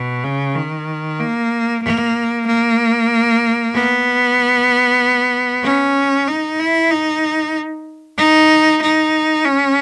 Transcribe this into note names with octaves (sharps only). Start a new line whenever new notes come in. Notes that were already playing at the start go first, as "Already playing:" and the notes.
Already playing: B2
C#3
D#3
A#3
A#3
A#3
B3
C#4
D#4
E4
D#4
D#4
D#4
C#4